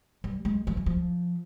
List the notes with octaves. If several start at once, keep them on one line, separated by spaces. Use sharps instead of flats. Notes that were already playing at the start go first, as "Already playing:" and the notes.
G3
G#3
F3
E3
F3